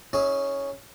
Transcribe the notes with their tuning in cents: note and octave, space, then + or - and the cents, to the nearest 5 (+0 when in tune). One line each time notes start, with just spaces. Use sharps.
C#4 +0 E4 -45 G#4 +0